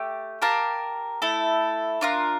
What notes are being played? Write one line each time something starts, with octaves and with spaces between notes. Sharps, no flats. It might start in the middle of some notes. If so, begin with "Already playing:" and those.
Already playing: A3 G4
G4 A#4 F5 A5
A3 E4 A4
D4 F4 A#4